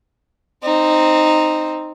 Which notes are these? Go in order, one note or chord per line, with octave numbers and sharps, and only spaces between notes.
C4 D#4